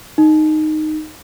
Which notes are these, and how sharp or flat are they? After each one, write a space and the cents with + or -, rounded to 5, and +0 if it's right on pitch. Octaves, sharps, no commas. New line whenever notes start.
D#4 -10